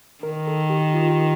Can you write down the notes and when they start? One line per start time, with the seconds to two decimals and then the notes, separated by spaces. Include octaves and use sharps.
0.23 D#3 A#4
0.47 A4
0.70 G4
0.94 F4
1.10 G4